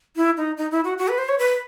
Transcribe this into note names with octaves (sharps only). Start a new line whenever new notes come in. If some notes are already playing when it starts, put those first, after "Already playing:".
E4
D#4
D#4
E4
F#4
F#4
B4
C5
C#5
B4